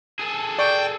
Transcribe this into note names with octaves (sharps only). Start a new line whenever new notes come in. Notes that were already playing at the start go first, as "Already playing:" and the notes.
G#4 A4
D5 G5 C#6